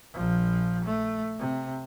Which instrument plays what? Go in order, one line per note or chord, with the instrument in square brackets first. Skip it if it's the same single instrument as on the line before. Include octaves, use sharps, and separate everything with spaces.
[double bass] A#1 F3
A3
C3